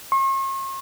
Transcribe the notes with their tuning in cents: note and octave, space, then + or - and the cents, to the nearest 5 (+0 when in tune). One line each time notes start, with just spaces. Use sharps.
C#6 -45